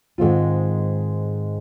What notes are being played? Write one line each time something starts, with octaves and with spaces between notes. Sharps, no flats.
G#2 D#3 G#3 C4 F4